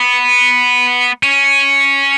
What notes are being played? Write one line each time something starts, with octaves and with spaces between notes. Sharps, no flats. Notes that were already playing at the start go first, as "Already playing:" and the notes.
Already playing: B3
C#4